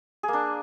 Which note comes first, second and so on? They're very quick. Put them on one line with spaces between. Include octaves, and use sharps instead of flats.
G#4 A#3 D4